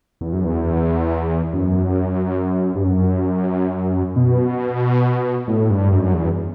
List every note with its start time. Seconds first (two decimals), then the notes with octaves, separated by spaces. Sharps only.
0.21 E2
0.33 F#2
0.44 E2
1.53 F#2
2.75 G2
2.84 F#2
4.16 B2
5.48 A2
5.70 G2
5.92 F#2
6.14 E2